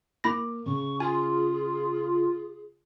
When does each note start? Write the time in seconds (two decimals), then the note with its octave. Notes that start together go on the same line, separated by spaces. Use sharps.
0.24 A#3 E4 B5 D6 A#6
0.66 C#3 C#6
1.00 F4 G#4 G#5